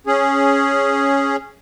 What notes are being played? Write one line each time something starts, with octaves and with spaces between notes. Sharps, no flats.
C#4 G#4